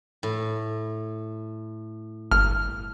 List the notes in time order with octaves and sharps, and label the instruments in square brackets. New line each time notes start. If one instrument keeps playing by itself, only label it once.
[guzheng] A2
[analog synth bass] G1 [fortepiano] F6